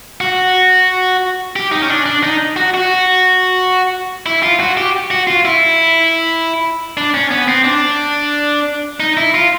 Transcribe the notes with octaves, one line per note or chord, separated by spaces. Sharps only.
F#4
G4
D#4
C#4
D4
D4
D#4
F#4
F#4
E4
F4
F#4
G4
F#4
F4
E4
D4
C#4
B3
C4
D4
D#4
E4
F4